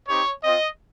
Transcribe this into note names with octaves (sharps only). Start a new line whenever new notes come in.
C4 D#4 G4 C#5
C4 F4 D#5